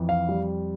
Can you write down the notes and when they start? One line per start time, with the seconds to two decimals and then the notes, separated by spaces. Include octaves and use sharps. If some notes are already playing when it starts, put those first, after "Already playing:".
Already playing: F2 E3
0.09 F5
0.29 G3